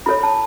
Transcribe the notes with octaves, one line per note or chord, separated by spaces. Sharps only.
E4 A4 C#5 B5
A5